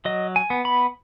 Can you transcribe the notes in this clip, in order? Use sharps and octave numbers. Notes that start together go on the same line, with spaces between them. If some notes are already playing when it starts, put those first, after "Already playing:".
F#3 D#5
G#5
B3
B5